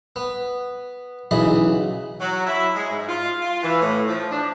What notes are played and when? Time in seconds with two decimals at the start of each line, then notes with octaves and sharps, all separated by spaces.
0.16 B3
1.31 B1 C#3 E3 D#5 B5
2.20 F#3
2.47 E4
2.76 G#3
2.90 G#2
3.08 F4
3.42 F4
3.63 E3
3.82 A2
4.08 F3
4.31 D4